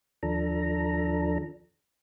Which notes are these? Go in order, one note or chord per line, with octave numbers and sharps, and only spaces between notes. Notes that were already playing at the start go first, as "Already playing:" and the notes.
D#2 F3 D4 A4 A#5